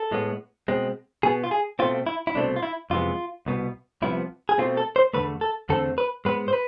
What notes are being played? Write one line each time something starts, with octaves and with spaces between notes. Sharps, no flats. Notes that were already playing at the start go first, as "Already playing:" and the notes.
Already playing: A4
A2 G#3 B3
B2 G#3 C4
B2 B3 G#4
F4
G#4
B2 A3 C4 F4
E4
E4
C2 B2 A3 C4 D4
F4
E4
F2 C3 E3 G#3 B3 F4
C2 B2 B3
C2 C3 F3 B3 E4
G#4
B2 A3 C4 F4
A4
C5
E2 D3 A3 B4
A4
E2 D3 A3 C4 A4
B4
G#2 G#3 B3 B4
C5
B4